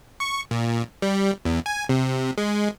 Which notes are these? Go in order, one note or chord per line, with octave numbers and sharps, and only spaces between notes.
C#6
A#2
G3
E2
G#5
C3
G#3